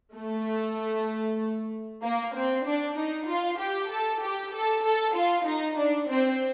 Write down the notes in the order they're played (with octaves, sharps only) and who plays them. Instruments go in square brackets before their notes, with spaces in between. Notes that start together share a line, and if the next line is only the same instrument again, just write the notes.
[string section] A3
A#3
C4
D4
D#4
F4
G4
A4
G4
A4
A4
F4
D#4
D4
C4